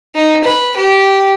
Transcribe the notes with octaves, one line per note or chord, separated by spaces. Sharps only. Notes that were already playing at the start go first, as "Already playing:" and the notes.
D#4
B4
G4